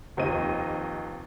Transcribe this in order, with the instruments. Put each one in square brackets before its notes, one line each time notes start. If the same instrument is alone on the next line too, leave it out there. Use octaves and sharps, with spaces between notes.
[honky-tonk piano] F1 D#2 C4 D#5 D#7